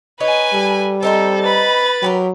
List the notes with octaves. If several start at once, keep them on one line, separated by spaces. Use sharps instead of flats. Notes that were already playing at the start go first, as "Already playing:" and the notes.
D#4 B4 C#5 G#5
G3 A4
C4 D#4 A4 C5
B4 B5 A6
F#3 G4 G#4 A#4